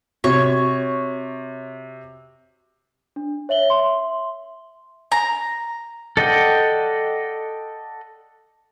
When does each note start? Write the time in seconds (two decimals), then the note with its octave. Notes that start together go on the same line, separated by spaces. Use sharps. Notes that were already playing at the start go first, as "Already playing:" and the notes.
0.24 C3 F#4 C#5
3.16 D4
3.49 C#5 E5 F#7 G7
3.70 E5 C6
5.12 A#5
6.17 A4 D5 D#5 F#5 G5